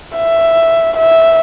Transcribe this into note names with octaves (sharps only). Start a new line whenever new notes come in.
E5
E5